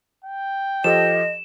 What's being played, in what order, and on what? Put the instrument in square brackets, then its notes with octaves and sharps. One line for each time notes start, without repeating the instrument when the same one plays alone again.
[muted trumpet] G5
[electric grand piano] F3 G4 A4 [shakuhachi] D#5 [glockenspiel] E7